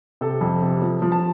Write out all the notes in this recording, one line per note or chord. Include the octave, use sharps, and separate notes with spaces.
C3 A4
F2
C3
F3
F3
A5